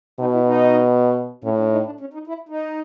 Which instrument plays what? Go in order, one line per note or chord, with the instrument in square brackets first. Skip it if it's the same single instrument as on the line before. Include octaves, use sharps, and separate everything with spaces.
[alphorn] B2 [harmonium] D#4
[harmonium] E4
D#4
[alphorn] A2 [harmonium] C#4
[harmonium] D4
D#4
D4
C#4
D#4
E4
D#4